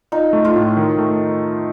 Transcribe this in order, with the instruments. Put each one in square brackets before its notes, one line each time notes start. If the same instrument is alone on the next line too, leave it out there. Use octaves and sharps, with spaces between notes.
[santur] D#4 [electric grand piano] F4
[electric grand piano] A3
[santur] F4
[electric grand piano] A2
D#3
A3